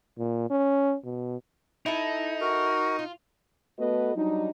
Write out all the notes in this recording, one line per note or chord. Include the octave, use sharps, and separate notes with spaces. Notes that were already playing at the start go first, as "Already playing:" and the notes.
A#2
C#4
B2
D#4 E4 A4
F#4 A#4
F4
A3 B3 F#4 A4 B4 D#5
F#3 G3 D4 D#4